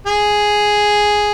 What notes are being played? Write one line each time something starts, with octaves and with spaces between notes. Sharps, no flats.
G#4